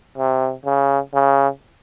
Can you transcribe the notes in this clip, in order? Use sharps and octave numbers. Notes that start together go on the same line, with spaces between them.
C3
C#3
C#3